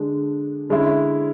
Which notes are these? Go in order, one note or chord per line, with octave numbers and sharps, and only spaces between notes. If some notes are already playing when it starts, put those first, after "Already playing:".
Already playing: D3 G#3 D4
D3 G#3 C#4 E4